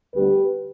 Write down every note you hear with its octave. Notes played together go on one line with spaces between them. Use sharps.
D2 D3 G3 B3 G4 B4